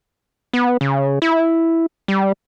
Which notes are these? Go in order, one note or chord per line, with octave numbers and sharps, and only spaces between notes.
B3
C#3
E4
G3